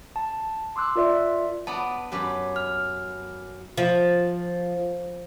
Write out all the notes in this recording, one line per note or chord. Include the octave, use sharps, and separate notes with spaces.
A5
C6 D6 E6 F#6
F4 A#4 D5 E5
B3 D5 F#5 A5
F#2 G4 B4
F6
F3